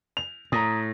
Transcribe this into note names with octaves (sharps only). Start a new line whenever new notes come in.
F7
A2 A#5 D#6